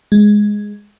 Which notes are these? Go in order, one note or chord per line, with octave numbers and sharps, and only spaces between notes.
G#3